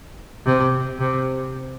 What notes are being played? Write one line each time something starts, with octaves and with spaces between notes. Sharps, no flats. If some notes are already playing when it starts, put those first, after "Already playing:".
C3
C3